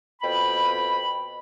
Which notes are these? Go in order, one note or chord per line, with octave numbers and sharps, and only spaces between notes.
F2 B2 G5 B5